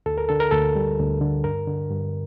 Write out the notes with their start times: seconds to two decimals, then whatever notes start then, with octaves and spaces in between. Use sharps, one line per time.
0.06 D2 A4
0.18 A#4
0.29 D3 A4
0.40 A#4
0.51 D2 A4
0.75 G3
0.99 D2
1.21 D3
1.44 G2 A#4
1.67 D3
1.91 G2